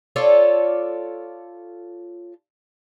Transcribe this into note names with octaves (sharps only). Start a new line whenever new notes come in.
F4 A4 C#5 D5